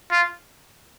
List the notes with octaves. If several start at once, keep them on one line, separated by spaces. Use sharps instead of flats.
F4